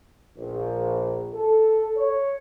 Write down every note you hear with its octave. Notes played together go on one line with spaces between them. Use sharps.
A#1
A4
C#5